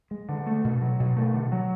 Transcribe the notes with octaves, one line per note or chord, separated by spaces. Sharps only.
G#3
D3
A3
B2
F#3
B2
A3
D3
F#3